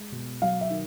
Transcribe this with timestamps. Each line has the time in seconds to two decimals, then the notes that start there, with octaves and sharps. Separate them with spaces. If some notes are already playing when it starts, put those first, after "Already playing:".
Already playing: G#3
0.12 B2
0.42 F#3 F5
0.61 E5
0.70 D#3